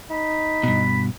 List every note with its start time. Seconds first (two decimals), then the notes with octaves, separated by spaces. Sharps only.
0.10 D#4 B5
0.63 G2 B2 B5